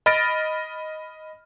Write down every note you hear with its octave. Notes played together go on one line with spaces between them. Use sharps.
D#5 B5 F6 A6 A#6 D7